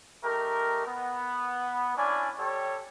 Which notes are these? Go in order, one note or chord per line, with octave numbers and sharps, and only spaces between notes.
A3 D#4 G4 A#4
B3
C#4 D4 E4 D5 G#5
G3 G4 A4 C#5